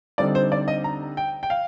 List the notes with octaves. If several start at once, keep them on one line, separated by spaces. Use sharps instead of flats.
D3 G3 C4 D#4 D5
C5
D5
D#5
A#5
G5
G5
F5